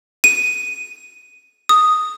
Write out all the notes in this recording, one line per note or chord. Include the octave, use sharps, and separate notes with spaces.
D#7
D#6